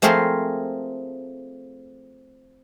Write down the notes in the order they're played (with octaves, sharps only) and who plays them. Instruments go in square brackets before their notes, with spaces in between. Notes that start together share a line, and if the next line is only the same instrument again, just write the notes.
[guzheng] F3 A3 C4 G#4 A#4 C5